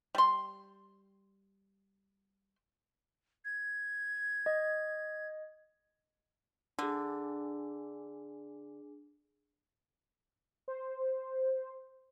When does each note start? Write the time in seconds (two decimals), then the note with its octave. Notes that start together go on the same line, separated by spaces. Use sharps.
0.15 G3 C6
3.45 G#6
4.46 D#5
6.79 D3 D4 G#4
10.68 C5